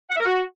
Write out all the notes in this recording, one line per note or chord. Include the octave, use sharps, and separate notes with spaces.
F#5
E5
A#4
F#4